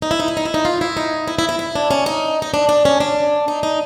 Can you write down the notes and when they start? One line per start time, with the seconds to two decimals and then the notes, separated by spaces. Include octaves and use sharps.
0.02 D#4
0.11 E4
0.20 D#4
0.28 E4
0.37 D#4
0.45 E4
0.54 D#4
0.65 F4
0.81 E4
0.97 D#4
1.28 E4
1.39 E4
1.49 E4
1.59 E4
1.75 D4
1.91 C#4
2.06 D#4
2.42 D#4
2.54 D4
2.69 D4
2.85 C#4
3.00 D4
3.48 D#4
3.63 D#4